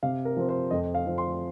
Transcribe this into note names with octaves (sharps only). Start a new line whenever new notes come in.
C3 F5
A#4
F3 C4
C5
F2 D#5
F5
F3 C4
C6